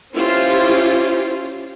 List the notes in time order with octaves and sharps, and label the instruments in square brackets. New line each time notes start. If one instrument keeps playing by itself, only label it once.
[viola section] C#4 E4 F4 G4 C5